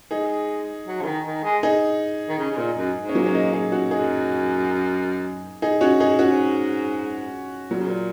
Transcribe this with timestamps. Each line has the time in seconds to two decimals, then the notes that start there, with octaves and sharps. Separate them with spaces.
0.11 G#3 D#4 G#4
0.86 F#3
1.01 C#3
1.06 D#3
1.26 D#3
1.44 G#3
1.63 D#4 G#4
2.29 D#3
2.39 C#3
2.51 C#3
2.57 A#2
2.77 F#2
2.96 G#2
3.09 C#4
3.15 F#3 A#3
3.26 C#4
3.34 A#3 D#4
3.53 D#4 G#4
3.72 C#4 F#4
3.91 F#2 D#4 G#4
5.62 D#4 G#4
5.81 C#4 F#4
6.00 D#4 G#4
6.19 G#2 C#4 F#4
7.71 A#2 F#3
7.78 C#3
7.87 A#2